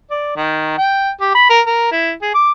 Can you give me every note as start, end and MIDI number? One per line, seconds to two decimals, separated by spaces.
0.10 0.32 74
0.36 0.75 51
0.78 1.10 79
1.21 1.33 67
1.34 1.45 83
1.49 1.61 70
1.66 1.87 70
1.91 2.12 64
2.22 2.30 68
2.34 2.52 86